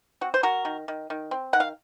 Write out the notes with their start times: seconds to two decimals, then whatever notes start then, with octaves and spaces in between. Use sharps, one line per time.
0.21 C4 F#4
0.34 C5
0.43 F#3 F#4 A#4
0.65 D#3
0.88 D#3
1.10 D#3
1.31 C4
1.53 D#3 F#5
1.60 F5